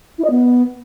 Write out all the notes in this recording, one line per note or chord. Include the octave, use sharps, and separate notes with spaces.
E4
D#5
B3